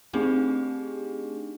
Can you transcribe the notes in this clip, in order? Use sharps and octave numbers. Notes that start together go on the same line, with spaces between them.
A3 C4 D4 D#4 G4 G#4